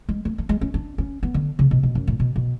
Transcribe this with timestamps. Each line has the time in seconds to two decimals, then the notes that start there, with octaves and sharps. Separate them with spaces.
0.09 G#3
0.25 A3
0.38 A3
0.49 G#3
0.61 C#4
0.74 D4
0.98 C#4
1.23 B3
1.34 D3
1.59 C#3
1.71 B2
1.83 B2
1.95 F#2
2.08 A2
2.20 B2
2.36 B2